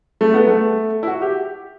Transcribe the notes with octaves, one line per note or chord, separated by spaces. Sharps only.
A3
B3
A3
E4
F#4
G4